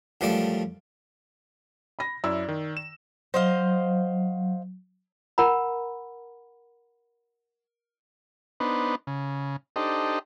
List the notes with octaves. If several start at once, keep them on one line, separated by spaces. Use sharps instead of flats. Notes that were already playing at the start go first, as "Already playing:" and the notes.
F#2 F3 G3 A3 D5
B5 A#6
F#2 E4 D5 E6
D#3
E7
F#3 C5 D#5 F5
A#4 F#5 A#5 B5
B3 D4 D#4 B4 C5
C#3
D4 D#4 G4 A4 C5 D#5